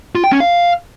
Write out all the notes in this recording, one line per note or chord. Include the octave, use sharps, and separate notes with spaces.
F4
G5
C#4
F5